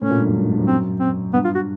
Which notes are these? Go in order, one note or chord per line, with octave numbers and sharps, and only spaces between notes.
A2 C#4
A#2
G2
F#2
G2
G#2
G2
F#2
C4
C4
G2 B3
F4
F#4